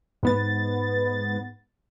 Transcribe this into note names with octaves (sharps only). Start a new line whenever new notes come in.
G#2 B3 A6